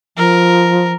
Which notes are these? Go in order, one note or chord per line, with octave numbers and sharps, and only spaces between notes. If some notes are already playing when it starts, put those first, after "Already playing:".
F3 A#4